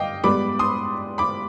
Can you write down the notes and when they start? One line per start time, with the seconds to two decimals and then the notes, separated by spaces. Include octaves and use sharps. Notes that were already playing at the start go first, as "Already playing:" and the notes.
Already playing: G2 D#5 F5 G5 D6
0.24 G#2 G3 B3 B5 D6
0.59 C6 D#6
1.18 B5 D6